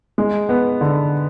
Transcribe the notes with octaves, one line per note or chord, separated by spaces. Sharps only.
G#3
B3
D3